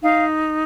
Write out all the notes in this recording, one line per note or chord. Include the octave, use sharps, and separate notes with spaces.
D#4 F5